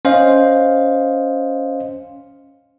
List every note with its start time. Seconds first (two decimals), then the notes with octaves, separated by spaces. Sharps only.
0.05 C#4 C5 D#5 F5